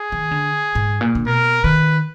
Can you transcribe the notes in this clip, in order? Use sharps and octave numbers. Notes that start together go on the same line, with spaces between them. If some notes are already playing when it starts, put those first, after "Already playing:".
Already playing: G#4
D#3
D3
G#2
A#2
D3
B2 A#4
D#3 B4